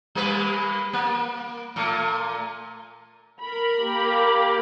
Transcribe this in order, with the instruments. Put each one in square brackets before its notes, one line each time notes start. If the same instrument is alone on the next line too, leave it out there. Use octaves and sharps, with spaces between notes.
[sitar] G3 A#3 B4
A#3
A#2 A3
[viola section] A#4 B5
[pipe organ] A#3 G4